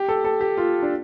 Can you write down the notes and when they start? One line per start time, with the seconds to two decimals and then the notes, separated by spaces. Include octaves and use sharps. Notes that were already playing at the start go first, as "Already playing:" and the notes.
Already playing: G4
0.09 A4
0.24 A4
0.41 G4
0.57 F4
0.83 D4